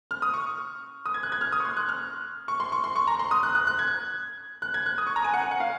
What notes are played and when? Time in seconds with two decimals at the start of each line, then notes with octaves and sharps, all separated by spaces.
0.11 F6
0.22 D#6
0.34 C#6
1.06 D#6
1.14 G#6
1.23 F#6
1.32 G#6
1.41 F6
1.52 D#6
1.60 C#6
1.65 C6
1.77 F#6
1.89 F6
2.48 C#6
2.60 C6
2.72 C#6
2.84 C6
2.96 C#6
3.07 A#5
3.19 C6
3.31 D#6
3.43 F#6
3.55 F#6
3.67 F#6
3.79 G#6
4.62 F#6
4.74 G#6
4.86 F#6
4.98 D#6
5.07 C#6
5.16 A#5
5.24 G#5
5.34 F#5
5.42 G#5
5.51 F#5
5.60 F5